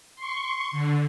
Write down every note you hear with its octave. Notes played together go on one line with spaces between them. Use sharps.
C6 C#6
D3